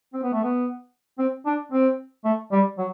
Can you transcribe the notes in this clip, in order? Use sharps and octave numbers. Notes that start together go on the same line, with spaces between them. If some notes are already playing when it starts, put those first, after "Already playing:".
C4
B3
A3
B3
C4
D4
C4
A3
G3
F#3